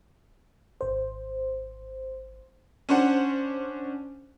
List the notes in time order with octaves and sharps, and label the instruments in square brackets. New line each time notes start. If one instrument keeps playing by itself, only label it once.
[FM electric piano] G#1 C5
[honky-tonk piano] C#4 D4 C5 F#5